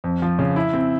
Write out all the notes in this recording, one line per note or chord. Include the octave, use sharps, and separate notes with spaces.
F2
F3
C#3
E4
C4